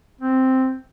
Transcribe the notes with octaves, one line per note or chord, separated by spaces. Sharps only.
C4